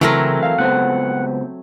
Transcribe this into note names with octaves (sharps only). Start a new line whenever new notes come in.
C#3 E3 F#3 A3 C4 E4 A#4
F5
C#2 B3 C5 F#5